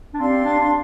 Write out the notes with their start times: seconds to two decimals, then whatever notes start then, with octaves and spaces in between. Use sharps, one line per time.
0.14 D4
0.20 C4 G4 D5 F5 C6
0.45 D4
0.59 D4